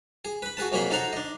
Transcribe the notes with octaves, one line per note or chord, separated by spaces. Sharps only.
G#4
B4 B5
F#4 G#4 B4 A5
F2 F#3 A#3 G#4 B5 C6
D#4 A4 C5 F#5 A#5 C6
D4 D#5